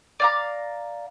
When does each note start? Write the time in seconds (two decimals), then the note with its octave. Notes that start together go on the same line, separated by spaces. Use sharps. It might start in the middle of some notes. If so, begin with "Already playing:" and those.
0.20 D5 F5 A#5